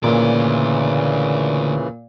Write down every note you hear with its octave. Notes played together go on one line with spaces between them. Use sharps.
D2 A#2 C#3 E3 D5